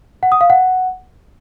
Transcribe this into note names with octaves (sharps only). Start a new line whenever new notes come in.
F#5
D#6
F5
F#5